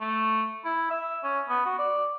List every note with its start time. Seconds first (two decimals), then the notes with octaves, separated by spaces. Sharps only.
0.01 A3
0.65 E4
0.90 E5
1.23 C#4
1.49 B3
1.66 F#4
1.78 D5